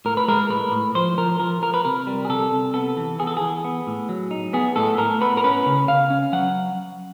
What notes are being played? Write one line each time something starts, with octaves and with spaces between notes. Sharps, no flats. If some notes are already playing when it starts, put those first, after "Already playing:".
A2 A#4
B4
G#3 A#4
A2 B4
A2
F3 C5
F3 A#4
F3 A#4
F3 A#4
B4
C3 A#4
G3
G#4
C3 A4
C3
B3 A4
E3
B3 G#4
A4
E3 G#4
B3
A2
F#3
D#4
B3 G#4
A2 A4
A2 A#4
B3 B4
A#4
C#4 B4
C#3
C#3 F5
C#4
F#3 F#5